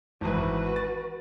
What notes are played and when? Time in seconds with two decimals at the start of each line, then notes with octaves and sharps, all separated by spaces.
0.21 G#1 E3 F#4 B4
0.76 A6